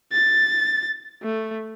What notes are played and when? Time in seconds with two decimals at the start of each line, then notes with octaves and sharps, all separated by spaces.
0.12 A6
1.23 A3